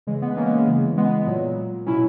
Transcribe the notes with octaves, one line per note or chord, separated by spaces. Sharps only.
C#3 E3 G#3
G#3 B3
A#3 C#4
G#3 B3
C#3 E3
G#3 B3
A#2 F#3
B2 F#3 C#4 E4